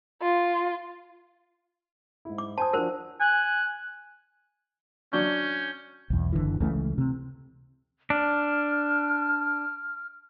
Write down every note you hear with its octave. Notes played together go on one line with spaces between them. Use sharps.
F4
G#2 E4
D6
C5 G#5 A5 D#6
F3 D4 F#4 A#4 C5
G#5 F#6
F#3 C#4 D4 C#6 G6
B1 E2
F#1 C2 D3 E3
C#2 C#3 E3 A3
C3
D4 F6